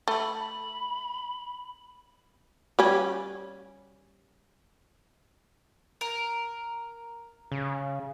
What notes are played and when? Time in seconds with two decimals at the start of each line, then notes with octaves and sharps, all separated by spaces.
0.08 A3 B5
2.79 G3 C#4
6.01 A#4
7.52 C#3